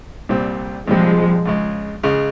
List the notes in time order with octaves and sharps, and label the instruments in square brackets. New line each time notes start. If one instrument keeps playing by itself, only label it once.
[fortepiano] C2 A#2 G3 C4
[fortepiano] C2 A#2 G3 C4 [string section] F3 G#3
[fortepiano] C#2 C#3 G#3
C#2 C#3 G#3